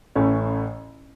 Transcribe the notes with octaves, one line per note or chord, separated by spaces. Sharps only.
A1 A2 E3 A3 C#4